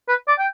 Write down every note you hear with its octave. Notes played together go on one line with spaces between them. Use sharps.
B4
D5
G5